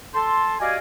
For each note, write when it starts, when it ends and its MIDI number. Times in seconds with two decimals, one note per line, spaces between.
0.14 0.55 69
0.14 0.55 81
0.14 0.55 84
0.60 0.78 66
0.60 0.78 67
0.60 0.78 74
0.60 0.78 75
0.60 0.78 77
0.60 0.78 80